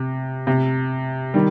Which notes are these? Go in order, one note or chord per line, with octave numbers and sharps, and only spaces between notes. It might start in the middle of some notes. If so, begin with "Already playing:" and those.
Already playing: C3
C3
D#3 G3